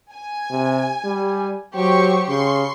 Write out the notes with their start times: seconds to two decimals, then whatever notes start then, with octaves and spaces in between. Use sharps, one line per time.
0.13 G#5
0.51 C3
1.05 G3
1.75 F#3 G4 C5 C#6
2.29 C#3 C6 C#6